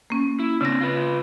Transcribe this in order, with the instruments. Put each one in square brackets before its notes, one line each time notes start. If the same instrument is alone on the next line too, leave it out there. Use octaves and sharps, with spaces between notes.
[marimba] A#3 C#4
[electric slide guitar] E4
[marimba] C#3 A#6 [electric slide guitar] C4 D4
[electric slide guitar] F4 B4